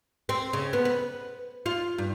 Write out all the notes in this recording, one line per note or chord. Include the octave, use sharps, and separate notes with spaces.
C4
C#3
B3
B4
F4
G2